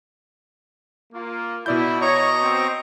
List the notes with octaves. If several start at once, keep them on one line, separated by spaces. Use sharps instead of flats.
A#3 F4
B2 E4 D5 G6
C#5 D#5 A#5 C#6
C4